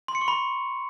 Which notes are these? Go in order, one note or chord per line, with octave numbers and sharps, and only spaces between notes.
C6
C#7
C#6
B5